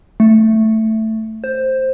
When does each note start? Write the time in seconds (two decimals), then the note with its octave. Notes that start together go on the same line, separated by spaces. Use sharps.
0.20 A3
1.44 C5